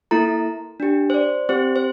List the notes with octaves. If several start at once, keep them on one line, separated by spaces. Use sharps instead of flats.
A#3 E4 A4 A#5
D4 G4
C5
D5
C4 G4 C5
C5